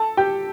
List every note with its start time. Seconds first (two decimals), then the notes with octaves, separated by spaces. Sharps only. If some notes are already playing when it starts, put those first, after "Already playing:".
Already playing: A4 A5
0.17 G4 G5